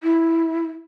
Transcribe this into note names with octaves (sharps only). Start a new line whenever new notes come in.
E4